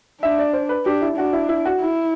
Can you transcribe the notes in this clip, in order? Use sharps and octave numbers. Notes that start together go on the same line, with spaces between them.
D4 E5
D5
C5
B4
D4 G4
E4
D4 F#4
E4
E4
F#4
E4